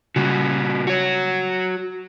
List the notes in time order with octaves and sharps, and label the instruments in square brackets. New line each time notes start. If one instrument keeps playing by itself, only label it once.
[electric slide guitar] A#2 F#4 [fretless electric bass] C#3 G3
[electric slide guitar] F#4 C#5